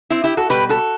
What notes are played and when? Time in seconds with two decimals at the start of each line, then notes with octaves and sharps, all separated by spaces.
0.10 C4 E4
0.24 E4 G4
0.37 F#4 A4
0.50 B2 G3 G4 B4
0.69 F#4 A4